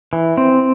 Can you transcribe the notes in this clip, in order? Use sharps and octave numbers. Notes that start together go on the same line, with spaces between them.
E3
C4